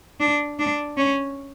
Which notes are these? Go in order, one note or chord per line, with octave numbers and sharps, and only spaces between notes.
D4
D4
C#4